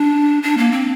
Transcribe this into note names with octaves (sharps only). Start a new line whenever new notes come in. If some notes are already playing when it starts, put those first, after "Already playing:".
Already playing: D4
D4
A#3
C4